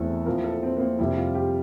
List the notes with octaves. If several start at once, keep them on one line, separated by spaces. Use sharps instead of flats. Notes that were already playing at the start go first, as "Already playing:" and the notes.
Already playing: E2 E3 A3 C4 E4 A4
A#2 F3 C4 E4 A#4
A4
C4
A#3
C4
F2 C3 G3 C4 E4
F4
G4